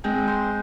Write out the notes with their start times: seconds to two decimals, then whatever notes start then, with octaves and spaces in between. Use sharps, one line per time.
0.04 G#3 C4
0.28 C5